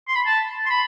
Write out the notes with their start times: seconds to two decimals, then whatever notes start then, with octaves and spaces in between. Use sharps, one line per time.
0.08 C6
0.15 B5
0.26 A5
0.66 C6
0.70 B5